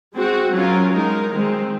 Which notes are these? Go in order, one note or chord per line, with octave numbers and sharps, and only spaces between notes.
G#3 C4 F#4
F#3 C#4 F4 A#4
G#3 D#4 A#4
D#3 G#3 C4